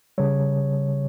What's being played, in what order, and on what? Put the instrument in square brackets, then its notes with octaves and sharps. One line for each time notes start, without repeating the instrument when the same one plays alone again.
[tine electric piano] C#3 G3 C#5